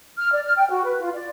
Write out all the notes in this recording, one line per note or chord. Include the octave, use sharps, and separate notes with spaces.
F6
D5
F6
G5
F#4
B4
F4
D5